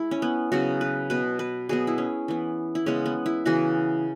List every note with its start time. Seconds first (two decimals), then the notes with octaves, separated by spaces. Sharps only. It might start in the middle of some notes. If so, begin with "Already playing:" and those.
Already playing: G#3 E4
0.11 C#4
0.22 B3
0.52 C#3 F#3 B3 F#4
0.81 B4
1.10 B2 B3 B4
1.39 B4
1.69 B2 F#3 B3 G#4
1.87 E4
1.98 C#4
2.28 E3 B3
2.75 E4
2.86 C#3 G#3 B3 C#4
3.06 B3
3.26 E4
3.45 C#3 E3 B3 F#4